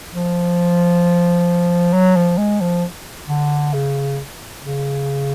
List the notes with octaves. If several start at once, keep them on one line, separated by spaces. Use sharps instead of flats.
F3
F#3
F3
G#3
F3
D3
C#3
C#3